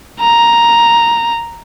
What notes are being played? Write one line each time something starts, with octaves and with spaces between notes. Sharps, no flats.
A#5